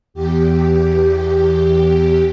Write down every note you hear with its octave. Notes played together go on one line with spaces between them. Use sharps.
E2 G4